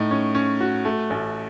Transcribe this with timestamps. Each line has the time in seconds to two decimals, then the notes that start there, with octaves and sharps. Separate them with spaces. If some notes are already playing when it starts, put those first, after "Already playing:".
Already playing: A2 D#4
0.11 C#4
0.35 C#4
0.61 F#4
0.85 A3
1.10 A1